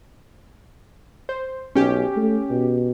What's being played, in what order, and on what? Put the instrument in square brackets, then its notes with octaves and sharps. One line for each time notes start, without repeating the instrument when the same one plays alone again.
[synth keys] C5
[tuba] B1 [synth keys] C#4 G4
[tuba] A3
B2